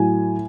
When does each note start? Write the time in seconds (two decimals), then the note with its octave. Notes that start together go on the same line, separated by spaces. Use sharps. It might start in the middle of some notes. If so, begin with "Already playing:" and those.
Already playing: A2 F#3 G#5